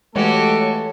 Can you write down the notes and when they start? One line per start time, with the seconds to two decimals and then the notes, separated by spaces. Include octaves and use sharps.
0.16 E3 G#3 A3 F#4 G4 A4 C#5